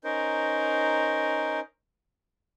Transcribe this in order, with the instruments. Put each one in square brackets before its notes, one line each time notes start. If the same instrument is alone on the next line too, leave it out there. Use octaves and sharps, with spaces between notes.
[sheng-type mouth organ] C#4 D#4 A#4 C5